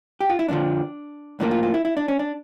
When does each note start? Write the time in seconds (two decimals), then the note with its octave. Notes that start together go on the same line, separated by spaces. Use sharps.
0.21 G4
0.29 F4
0.39 E4
0.48 F2 D3 F3 D4
1.40 A2 F3 A#3 D4
1.51 F4
1.63 F4
1.74 E4
1.85 E4
1.97 D4
2.08 C#4
2.19 D4